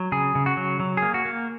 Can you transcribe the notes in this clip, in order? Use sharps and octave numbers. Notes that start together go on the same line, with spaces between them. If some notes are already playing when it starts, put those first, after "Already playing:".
Already playing: F#3
C#3 G#4
C#3
F#4
F#3
F#3
A#3 G#4
F#4
A#3